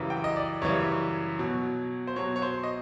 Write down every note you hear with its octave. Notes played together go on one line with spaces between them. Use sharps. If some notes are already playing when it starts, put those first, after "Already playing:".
Already playing: F#2 C#3 E3 G3
G5
D#5
D5
F#2 C#3 E3 G3 C#5
B2 F#3
C5
B2 F#3 C#5
C#5
C5
D#5